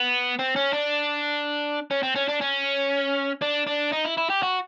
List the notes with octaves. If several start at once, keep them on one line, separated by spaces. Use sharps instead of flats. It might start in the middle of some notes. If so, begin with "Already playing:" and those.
Already playing: B3
C4
C#4
D4
C#4
C4
C#4
D4
C#4
D4
D4
D#4
E4
E4
G4
F#4